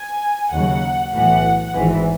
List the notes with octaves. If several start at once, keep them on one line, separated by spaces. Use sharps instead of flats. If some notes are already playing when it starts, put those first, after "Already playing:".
Already playing: G#5
D#2 C#3 F#3 F#5
B1 A2 E3 F#5
G#1 G#2 E3